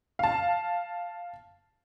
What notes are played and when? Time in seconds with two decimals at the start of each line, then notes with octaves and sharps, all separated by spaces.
0.19 F5 A5